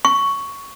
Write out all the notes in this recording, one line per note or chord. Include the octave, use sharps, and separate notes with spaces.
C#6